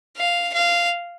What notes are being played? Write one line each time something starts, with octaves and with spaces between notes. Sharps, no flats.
F5
F5